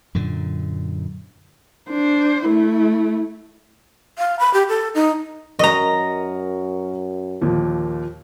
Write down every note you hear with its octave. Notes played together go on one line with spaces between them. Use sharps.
F#2 A#2 D3
D4 C5
A3 E4
F5
B5
G4
A4
D#4
F#2 A#4 D#5 A#5 C#6
D#2 A#2 F3